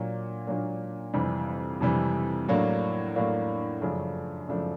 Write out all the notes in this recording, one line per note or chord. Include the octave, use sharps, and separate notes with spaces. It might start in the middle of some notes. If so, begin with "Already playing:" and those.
Already playing: A#2 F#3 A#3 D4
A#2 F#3 A#3 D4
F2 C3 E3 G3
F2 C3 E3 G3
A2 F#3 A#3 D4
A2 F#3 A#3 D4
F#2 C#3 F3 A3 D4
F#2 C#3 F3 A3 D4